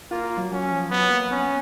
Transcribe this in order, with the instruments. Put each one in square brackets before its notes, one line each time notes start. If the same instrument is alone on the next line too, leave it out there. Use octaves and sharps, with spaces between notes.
[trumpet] A#3 [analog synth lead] F4
[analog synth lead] F4
F#3
[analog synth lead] F#3 [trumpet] C#4
[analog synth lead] F3
[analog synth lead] F#3 [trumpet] B3
[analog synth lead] A#3
[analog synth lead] B3 [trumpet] C#4